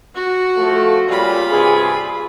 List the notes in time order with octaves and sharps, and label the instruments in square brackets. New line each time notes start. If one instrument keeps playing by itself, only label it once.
[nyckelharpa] F#4
[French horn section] F3 A3
[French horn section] A#2 C#3 G3 [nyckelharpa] F4 B5
[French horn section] G2 C3 G#4